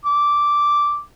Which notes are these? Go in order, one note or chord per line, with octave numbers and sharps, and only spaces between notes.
D6